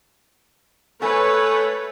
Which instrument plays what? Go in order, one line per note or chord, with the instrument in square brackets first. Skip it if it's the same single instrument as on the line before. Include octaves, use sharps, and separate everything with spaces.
[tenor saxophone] A3 [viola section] B4 C#5 [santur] G#5